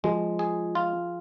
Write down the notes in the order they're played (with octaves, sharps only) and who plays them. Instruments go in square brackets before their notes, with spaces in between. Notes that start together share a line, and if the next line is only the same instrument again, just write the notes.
[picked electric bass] F3 [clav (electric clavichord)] G#3
[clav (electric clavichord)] G#4
F4